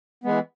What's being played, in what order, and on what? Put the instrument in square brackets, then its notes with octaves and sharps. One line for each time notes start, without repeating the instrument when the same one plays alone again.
[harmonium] E3 G#3 B3